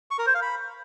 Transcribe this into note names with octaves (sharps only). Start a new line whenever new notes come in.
C#6
A#4
C5
F5
B5